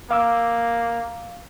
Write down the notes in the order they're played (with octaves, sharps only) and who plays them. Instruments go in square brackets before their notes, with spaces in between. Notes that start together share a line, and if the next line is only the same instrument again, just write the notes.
[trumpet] A#3 [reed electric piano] F5 D6 E6